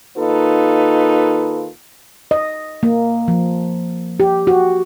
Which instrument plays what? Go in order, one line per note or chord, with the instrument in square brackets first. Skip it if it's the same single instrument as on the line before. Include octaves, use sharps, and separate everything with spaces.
[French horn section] D#3 A#3 D#4 F4 A4 B4
[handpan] D#5
A#3
F3
G4
F#4